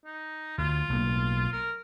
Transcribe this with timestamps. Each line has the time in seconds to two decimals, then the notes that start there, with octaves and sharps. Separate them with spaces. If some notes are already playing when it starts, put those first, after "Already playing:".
0.05 D#4
0.58 D2 F4
0.90 B1 A2 A#3
1.52 A#4